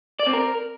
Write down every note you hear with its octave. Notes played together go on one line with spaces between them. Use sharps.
D5
C4
A#4